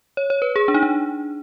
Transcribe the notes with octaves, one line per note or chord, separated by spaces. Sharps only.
C#5
C#5
B4
G#4
D4
D#4
D4